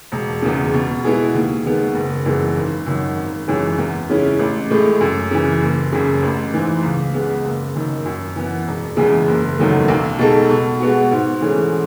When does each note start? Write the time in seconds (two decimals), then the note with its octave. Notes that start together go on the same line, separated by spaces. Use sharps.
0.12 E1
0.42 E2 C#3
0.74 B2
1.04 G#3 B3 E4 G#4
1.34 D#2
1.66 D#3 G#3 B3
1.95 F#1
2.26 F#2 E3 G#3 B3
2.56 G#1
2.86 F#2 D#3 F#3
3.17 G#1
3.48 F#2 E3 G#3 C#4
3.78 E2
4.10 C#3 G#3 C#4 E4
4.39 A1
4.70 A2 G#3
5.01 F#2
5.31 C#3 E3
5.61 F#1
5.92 F#2 C#3
6.22 A1
6.53 G#2 E3
6.83 C#2
7.14 C#3 G#3 B3
7.44 F#1
7.75 F#2 D#3
8.06 F#2
8.36 E3 B3
8.67 E1
8.96 E2 C#3 E3 G#3
9.28 F#1
9.57 E2 D#3 F#3 A3
9.88 B1
10.19 B2 G#3 D#4 A4
10.50 B2
10.80 G#3 B3 F#4
11.11 G#2
11.41 E3 A3 C#4 G#4